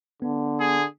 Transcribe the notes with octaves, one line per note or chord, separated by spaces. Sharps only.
D3 B3
G#4